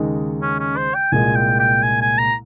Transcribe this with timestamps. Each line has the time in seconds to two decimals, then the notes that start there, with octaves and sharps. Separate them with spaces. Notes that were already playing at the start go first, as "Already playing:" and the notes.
Already playing: D#2 C#3 G#3 D#4
0.42 C#4
0.60 C#4
0.77 C5
0.95 G5
1.12 C2 A#2 G#3 G#5
1.36 G5
1.59 G5
1.83 G#5
2.02 G#5
2.18 A#5